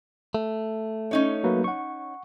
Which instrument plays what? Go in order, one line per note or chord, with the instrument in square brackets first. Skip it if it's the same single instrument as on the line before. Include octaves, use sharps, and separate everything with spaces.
[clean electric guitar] A3
[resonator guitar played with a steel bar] C#4 D#4 C#5
[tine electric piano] F#3 A#3 B4
F#5 C#6